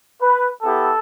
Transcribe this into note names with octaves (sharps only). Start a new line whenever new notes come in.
B4
B3 E4 G4 A4